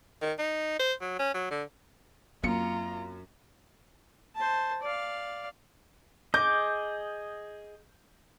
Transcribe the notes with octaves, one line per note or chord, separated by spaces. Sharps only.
D#3
D#4
C5
F#3
C#4
F#3
D3
F#2 A#3 C4 F4 A#5 C#7
C5 A5
D5 F5
G#4 D#5 D6 G6